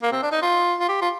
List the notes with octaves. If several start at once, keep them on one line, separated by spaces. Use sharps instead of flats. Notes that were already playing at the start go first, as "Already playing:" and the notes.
A#3
C4
D4
D#4
F4
F4
G4
F4